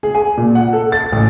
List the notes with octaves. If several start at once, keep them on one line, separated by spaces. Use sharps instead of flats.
G#4
G#5
A#2
F#5
A4
A6
A1